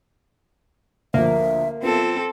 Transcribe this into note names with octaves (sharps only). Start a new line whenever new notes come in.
D2 F3 A#3 E5
B3 C4 F4 A4